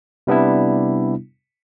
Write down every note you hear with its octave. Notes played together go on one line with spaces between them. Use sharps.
C3 G3 B3 D4 E4